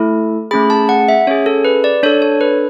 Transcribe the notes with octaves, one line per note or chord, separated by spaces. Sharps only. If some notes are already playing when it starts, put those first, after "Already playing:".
Already playing: A3 E4 A4
A3 C#4 G#4 B5
A5
F#5
E5
C#4 G#4 C#5
A4
B4
D5
D4 A4 C#5
C#5
B4